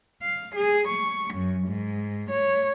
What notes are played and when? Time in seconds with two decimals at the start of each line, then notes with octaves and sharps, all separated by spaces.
0.21 F5
0.55 G#4
0.88 C#6
1.33 F#2
1.67 G#2
2.31 C#5